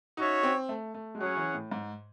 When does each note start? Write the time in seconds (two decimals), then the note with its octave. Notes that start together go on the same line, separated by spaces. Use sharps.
0.17 C#4 D#4 F#4 C#5 E5
0.43 C4
0.69 A3
0.94 A3
1.15 G#3
1.20 F#3 C#4 G#4 C#5 F#5
1.37 E3
1.55 A2
1.72 G#2